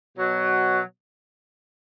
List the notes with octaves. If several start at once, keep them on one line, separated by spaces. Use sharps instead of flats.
B2 F#3